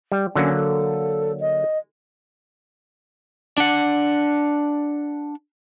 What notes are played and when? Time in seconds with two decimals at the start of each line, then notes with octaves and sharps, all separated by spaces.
0.12 G3
0.35 D3 F#3 A#3 C#4
0.55 A4
1.40 D#5
3.58 D4 F#5